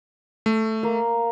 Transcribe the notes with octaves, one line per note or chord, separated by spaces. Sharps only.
A3
A#3 F5